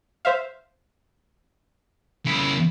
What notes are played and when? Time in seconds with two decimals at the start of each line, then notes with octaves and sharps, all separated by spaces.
0.25 C5 E5 F5
2.26 C#3 E4